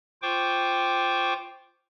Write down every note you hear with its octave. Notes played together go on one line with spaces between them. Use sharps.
F4 C5 G5 C#6 D6